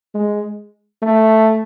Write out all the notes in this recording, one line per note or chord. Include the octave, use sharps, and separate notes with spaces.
G#3
A3